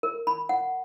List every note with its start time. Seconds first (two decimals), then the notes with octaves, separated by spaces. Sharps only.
0.03 A#4
0.27 B5
0.49 F#5